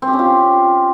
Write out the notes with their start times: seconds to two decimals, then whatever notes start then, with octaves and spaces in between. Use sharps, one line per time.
0.02 C4
0.08 G4
0.13 C#4
0.19 F4